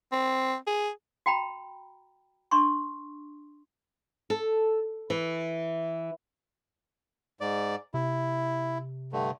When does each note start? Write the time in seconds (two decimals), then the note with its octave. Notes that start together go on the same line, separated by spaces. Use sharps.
0.12 C4
0.67 G#4
1.26 F#4 G5 A#5 B5
2.51 D4 C6 C#6
4.30 A4
5.10 E3
7.41 G#2 D5
7.94 C3 E4
9.13 G2 D3 A3